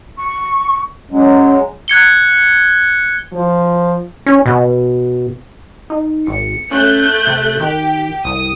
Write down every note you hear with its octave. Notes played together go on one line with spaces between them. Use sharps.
C#6
F#3 G#3 C#4
F#6 G#6 C#7 G7
F3
C#4
B2
D#4
G#1 C#7
A3 C#4 F#6 G6
C3
D#3 G4
C2 D#6